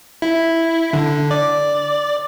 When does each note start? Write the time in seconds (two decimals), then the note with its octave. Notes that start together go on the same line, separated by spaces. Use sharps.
0.22 E4
0.93 D3
1.31 D5